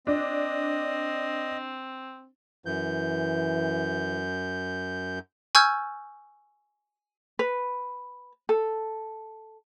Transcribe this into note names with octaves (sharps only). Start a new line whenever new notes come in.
C4 D4 D#5
F#2 E3 G6
G#5 C#6 E6 F6 G6 G#6
B4
A4